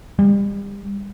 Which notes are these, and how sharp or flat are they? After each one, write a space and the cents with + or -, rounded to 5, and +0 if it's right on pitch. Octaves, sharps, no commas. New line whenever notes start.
G3 +35